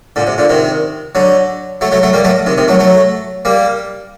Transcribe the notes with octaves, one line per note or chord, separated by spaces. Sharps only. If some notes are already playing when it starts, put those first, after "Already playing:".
A#2 D3
C3
A#2 D3
C3 D#3
D3 F#3
F#3 A3
F#3 A3
F#3 A3
G3 A#3
F#3 A3
C3 D#3
C3 D#3
F#3 A3
F#3 A3
G3 A#3